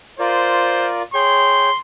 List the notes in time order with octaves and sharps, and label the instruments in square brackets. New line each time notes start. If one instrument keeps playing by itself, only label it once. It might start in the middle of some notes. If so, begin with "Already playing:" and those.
[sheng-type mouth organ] F4 A#4 D5 [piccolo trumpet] C5
[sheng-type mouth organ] G#4 C#5 G5 [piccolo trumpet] C6